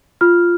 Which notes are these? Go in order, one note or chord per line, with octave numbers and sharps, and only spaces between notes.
F4 F6